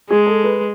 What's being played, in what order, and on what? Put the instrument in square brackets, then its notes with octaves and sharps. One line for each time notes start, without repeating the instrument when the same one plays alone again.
[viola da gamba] G#3 [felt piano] G#4
[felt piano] A4
B4